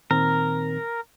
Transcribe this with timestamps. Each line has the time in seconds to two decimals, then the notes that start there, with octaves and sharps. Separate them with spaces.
0.11 A#2 D#3 C4 A#4